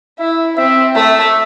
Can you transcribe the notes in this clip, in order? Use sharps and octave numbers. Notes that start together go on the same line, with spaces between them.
E4 E5
C4 E5
A3 E5